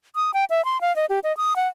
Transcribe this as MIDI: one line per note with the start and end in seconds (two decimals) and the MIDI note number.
0.15 0.31 87
0.34 0.45 79
0.50 0.64 76
0.65 0.80 84
0.81 0.95 77
0.96 1.06 75
1.09 1.19 67
1.24 1.35 75
1.37 1.56 87
1.56 1.68 78